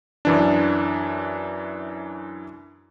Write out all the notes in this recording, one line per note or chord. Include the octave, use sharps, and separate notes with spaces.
F#2 E3 D4